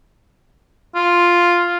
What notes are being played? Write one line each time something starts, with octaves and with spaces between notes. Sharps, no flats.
F4